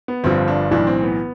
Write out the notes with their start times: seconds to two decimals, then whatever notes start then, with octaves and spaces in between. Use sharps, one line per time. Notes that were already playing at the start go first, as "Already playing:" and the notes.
0.08 B3
0.24 G1 G2 D3 F3 C4
0.48 D4
0.71 B1 A2 E3 D4
0.87 C4
1.03 B3